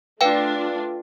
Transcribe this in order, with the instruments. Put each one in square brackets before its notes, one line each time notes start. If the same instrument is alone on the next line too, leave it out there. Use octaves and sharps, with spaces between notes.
[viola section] A3 D4 F4 [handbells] B4 F5 G5